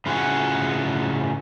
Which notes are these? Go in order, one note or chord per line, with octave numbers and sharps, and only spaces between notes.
A2 C#3 A3 F4 F#4 G#4